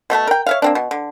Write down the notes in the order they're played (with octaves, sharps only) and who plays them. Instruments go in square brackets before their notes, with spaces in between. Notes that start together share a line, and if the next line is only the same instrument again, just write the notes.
[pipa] B2 A3 E5 A5
A#4 G5
C#5 E5 F5
A#3 C4 D4
B2
D3